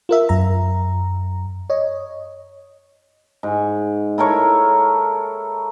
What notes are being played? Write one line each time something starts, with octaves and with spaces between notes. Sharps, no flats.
F4 A#4 E5
F#2 A#5
C#5 D#5
G#2
E4 A4 A#4 C#5